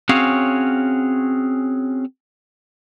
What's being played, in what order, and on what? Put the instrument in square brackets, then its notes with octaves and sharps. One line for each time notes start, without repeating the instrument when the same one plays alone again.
[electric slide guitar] C4 C#4 F#4 G#4 C#5 F5